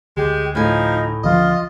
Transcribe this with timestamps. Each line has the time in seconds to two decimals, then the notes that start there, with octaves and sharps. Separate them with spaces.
0.17 D2 G#3 G4
0.55 A2 F3 D#4 G#5
1.23 C#2 D3 F3 F4 D#5